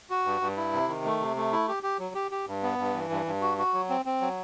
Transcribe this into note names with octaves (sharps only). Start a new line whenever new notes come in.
F#4
G2
G2
E4
C3
D#3
A3
C3
A3
E4
G4
G4
F#3
G4
G4
G2
B3
G2
E3
G2
G2
F#4
F#4
F#3
C4
C4
F#3